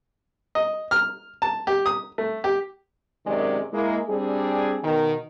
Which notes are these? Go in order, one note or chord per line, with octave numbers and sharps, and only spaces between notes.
D#5
F6
A5
G4
D#6
A3
G4
F#2 C3 D#3 G#3 G#4 D5
G#3 A#3 E4
G3 C4 D4 G#4
B2 D#3